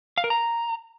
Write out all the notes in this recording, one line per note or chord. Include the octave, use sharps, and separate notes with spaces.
F5
A#4
A#5